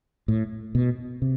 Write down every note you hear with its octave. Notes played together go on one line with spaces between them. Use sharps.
A2
B2
C3